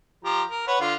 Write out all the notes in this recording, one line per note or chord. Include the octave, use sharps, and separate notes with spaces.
F3 G4 A#5
A#4
B4 C#5 F#5
D3 F4